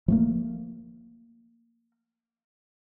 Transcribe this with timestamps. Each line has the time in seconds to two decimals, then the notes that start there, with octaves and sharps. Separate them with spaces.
0.08 F3 A3 A#3